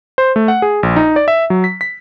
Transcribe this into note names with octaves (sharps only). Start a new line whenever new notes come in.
C5
A3
F#5
G#4
A#1
D#4
D5
E5
F#3
B6
B6